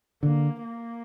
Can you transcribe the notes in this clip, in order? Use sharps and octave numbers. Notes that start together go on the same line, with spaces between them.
D3 A#3
A#3